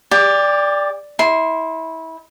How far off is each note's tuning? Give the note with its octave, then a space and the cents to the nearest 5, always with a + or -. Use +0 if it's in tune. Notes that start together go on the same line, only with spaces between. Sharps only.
G4 +30 D5 +0
E4 -25 C6 +0